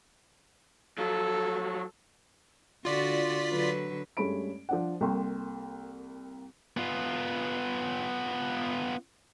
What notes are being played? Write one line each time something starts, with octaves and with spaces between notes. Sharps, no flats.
F3 F#3 A4
D3 F4 F#4 D5 B6
D3 F#3 B4
G2 G#3 A3 C#4 B5 D7
F3 D4 F#5
C2 A#3 A4 G5 C6 C#6
B3 F4